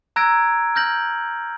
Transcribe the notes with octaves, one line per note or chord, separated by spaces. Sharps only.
A#5 E6 F#6 G#6 A#6 D7
F6 G6 A#6 F#7